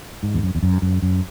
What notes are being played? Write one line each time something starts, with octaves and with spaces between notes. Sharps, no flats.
G#2
E2
F#2
E2
F#2
F#2
F#2